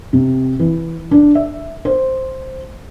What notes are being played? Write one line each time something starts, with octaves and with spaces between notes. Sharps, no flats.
C3
E3
D4
E5
C5